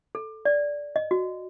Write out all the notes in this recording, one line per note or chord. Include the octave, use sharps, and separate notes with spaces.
A4
D5
D#5
F#4